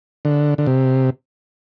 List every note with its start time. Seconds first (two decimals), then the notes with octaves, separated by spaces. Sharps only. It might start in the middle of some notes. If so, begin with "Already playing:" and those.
0.25 D3
0.58 D3
0.66 C3